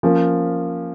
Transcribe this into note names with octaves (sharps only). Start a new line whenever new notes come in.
F3 A#3 C#4